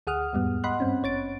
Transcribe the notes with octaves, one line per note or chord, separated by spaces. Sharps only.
D2 G#4 F#5 D#6 F6
E2 G#2 G3 B3
D#5 F#5 B5 C6 F#6
G2 C4 C#4
G#1 C#5 A6 D7